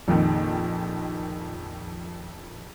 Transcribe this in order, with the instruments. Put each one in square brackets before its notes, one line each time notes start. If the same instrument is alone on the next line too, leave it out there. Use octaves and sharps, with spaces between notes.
[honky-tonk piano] A#1 F2 D#3